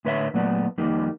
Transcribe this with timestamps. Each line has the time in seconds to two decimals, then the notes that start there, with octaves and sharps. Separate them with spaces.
0.05 A2 D3 B4 C#5 D5 E5
0.34 A#2 F#3 A3 B3 D5
0.78 F2 D#3 G3 A#3 D#4